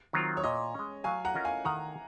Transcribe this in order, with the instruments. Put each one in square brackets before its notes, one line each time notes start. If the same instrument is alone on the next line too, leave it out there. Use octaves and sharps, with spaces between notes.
[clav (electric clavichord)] D#3 F#3 C4 F4
[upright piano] C#5
[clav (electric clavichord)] A#2 [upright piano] D#5
[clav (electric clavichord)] G#3 C#4
[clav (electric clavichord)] F#3 [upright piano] F5 G#5
[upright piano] F#5 A#5
[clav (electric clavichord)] C#4 F4 A#4 D#5
[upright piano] F5 G#5
[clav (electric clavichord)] D#3 [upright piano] F#5 A#5